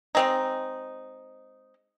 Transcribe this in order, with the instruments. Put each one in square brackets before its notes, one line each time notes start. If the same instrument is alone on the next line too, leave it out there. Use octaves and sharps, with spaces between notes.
[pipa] G#3 C4 D#4